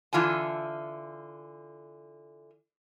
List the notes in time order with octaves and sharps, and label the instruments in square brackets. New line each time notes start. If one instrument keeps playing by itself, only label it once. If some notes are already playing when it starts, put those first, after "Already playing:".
[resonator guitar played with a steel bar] D3 E3 F4 G#5 A5